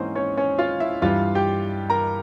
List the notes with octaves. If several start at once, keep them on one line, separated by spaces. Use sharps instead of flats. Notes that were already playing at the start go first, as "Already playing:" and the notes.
Already playing: G#2 E3 A#3 C4 C#4 G#4 C5
C#4 C#5
C#4 C#5
F4 F5
E4 E5
G2 E3 G3 F4 F5
G4 G5
A#4 A#5